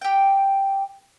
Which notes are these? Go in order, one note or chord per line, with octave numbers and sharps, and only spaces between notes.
G4 G5